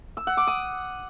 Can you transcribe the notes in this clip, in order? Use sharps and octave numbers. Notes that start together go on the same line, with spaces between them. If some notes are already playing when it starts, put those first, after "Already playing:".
E6
F#5
D6
D#6